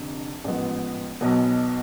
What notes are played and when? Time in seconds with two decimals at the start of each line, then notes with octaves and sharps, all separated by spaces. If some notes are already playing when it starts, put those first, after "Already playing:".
Already playing: F1 F2 D3
0.44 A1 G#2 F3 B3
1.21 B1 B2 F#3 B3